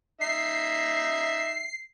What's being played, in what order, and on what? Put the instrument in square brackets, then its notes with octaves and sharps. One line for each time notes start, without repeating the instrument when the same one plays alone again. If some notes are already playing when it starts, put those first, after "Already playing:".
[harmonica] D#4 E5 [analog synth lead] C7